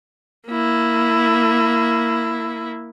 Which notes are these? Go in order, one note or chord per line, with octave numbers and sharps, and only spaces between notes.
A#3 E4